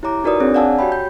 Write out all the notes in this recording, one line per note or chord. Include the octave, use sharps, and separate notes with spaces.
E4 G4 C#5 A#5 D6
D#4 F#4 A#4 B4 D5 D#6
C4 D4 G#4 C#5
D5 F5 F#5 G#5 A5 E6
F#4 G4 C#5 G5 B5
G6